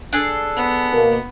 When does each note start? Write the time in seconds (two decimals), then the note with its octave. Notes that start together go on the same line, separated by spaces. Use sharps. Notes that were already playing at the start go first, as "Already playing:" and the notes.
0.13 D4 G#4 A4
0.56 B3
0.93 B2 A#3